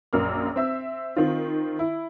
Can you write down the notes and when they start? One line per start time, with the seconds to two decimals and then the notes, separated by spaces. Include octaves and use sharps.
0.13 A#1 F#2 A#3 F6
0.56 C4 E5 E6
1.17 D#3 C4 F4
1.79 E4